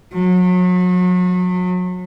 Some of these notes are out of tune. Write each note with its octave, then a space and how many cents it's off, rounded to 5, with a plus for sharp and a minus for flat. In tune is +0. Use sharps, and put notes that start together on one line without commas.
F#3 -35